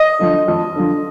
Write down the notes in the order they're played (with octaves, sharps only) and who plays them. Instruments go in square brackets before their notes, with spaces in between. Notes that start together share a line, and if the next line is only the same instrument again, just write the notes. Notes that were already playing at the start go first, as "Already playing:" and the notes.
Already playing: [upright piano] D#5
D3 F3
F2
D3 F3